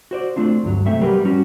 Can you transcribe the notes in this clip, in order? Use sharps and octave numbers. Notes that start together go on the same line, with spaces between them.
F#4 C5 D5
A3 C4 D4 F4
D2 G2 F#3
C2 G#3 A3 C4 E5
F#3 G3 G4 A#4 B4
G3 C#4 F#4